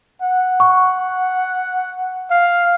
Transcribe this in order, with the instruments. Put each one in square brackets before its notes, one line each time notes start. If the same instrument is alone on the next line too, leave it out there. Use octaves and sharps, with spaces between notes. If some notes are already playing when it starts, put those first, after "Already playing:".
[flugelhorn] F#5
[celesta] C#6
[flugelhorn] F5